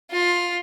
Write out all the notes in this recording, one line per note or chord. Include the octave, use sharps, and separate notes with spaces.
F4